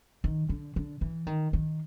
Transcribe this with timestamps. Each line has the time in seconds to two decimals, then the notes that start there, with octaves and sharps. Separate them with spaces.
0.24 D#3
0.49 D3
0.76 D3
1.01 E3
1.27 D#3
1.53 D#3